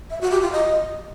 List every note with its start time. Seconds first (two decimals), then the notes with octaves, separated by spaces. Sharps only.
0.10 E5
0.21 F#4
0.31 G4
0.42 F4
0.52 D#5